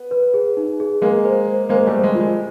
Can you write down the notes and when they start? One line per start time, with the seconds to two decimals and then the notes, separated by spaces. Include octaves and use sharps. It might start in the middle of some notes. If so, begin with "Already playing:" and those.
Already playing: B3
0.11 B4
0.34 G#4
0.57 D#4
0.80 G#4
1.02 G#3 A#3 G#4
1.25 C5
1.47 C5
1.69 G#3 A#3 C5
1.87 G3 A3
1.93 C5
2.04 G#3
2.15 F4
2.20 G#3